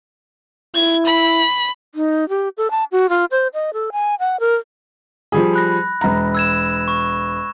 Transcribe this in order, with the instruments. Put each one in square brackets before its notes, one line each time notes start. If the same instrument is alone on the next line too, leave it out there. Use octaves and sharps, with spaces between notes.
[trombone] E4 [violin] G#6
[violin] B5
[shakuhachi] D#4
G4
A4
A5
F#4
F4
C5
D#5
A4
G#5
F#5
A#4
[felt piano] F3 G3 G#4
[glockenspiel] B5 F#6 A#6
[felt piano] E1 A#5
[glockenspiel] E6 G#6 E7
C#6